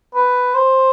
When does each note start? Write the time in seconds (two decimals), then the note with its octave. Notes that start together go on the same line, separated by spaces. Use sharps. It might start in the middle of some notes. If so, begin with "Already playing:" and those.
0.15 B4
0.54 C5